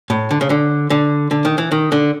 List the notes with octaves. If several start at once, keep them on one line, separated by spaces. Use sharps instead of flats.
A2
D3
C#3
D3
D3
D3
D#3
E3
D#3
D3